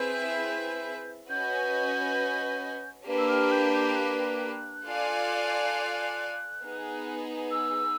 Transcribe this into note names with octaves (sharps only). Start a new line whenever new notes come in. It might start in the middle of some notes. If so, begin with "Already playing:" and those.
Already playing: C4 E4 G#4 B4 E5 G6
C#4 F#4 B4 D#5 G#5 G6
A#3 D4 G4 B4
E6
F6
G6
G6
F#6
F4 A4 D5 F5 G#5
B3 D#4 G#4
E6